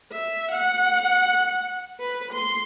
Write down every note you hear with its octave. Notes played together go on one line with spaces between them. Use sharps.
E5
F#5
B4
C6